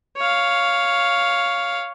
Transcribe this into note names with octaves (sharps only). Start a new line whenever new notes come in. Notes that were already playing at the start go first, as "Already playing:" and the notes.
C#5 F5